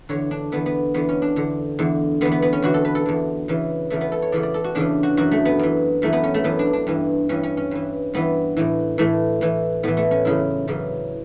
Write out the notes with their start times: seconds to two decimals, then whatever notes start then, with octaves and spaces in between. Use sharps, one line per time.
0.09 E2 D3 C#5
0.31 D4
0.52 E2 D3 B3
0.66 B3
0.94 E2 D3 B3
1.09 C#4
1.22 D4
1.36 E2 D3
1.79 E2 D3
2.21 E2 D3 B3
2.32 B3
2.42 B3
2.53 C#4
2.62 E2 D3 F#4
2.74 A4
2.85 B4
2.95 A4
3.06 E2 D3
3.48 E2 C#3 E3
3.90 E2 C#3 E3 A3
4.01 B3
4.12 A4
4.22 C#5
4.32 E2 C#3 E3 D5
4.43 D5
4.54 A4
4.64 F#4
4.75 E2 C#3 E3 D4
5.03 F#4
5.17 F#2 E3 F#4
5.31 A3
5.45 B3
5.59 F#2 E3
6.02 F#2 E3 A3
6.13 B3
6.24 C#4
6.34 A3
6.44 F#2 E3 B3
6.59 D4
6.73 D4
6.87 G2 E3
7.29 G2 E3 C#4
7.43 C#4
7.57 C#4
7.71 G2 E3
8.14 G2 E3 B3
8.57 A2 E3
8.98 A2 E3 A3
9.41 A2 E3
9.83 A2 E3 B3
9.97 A3
10.11 C#4
10.25 F#2 C#3 E3 E4
10.68 F#2 C#3 E3